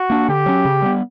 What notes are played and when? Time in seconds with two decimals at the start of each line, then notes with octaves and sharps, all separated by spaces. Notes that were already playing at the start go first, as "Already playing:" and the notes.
Already playing: F#4
0.10 A#3 D4
0.28 D3 G4
0.46 F#3 C#4
0.65 C#3
0.82 G3 B3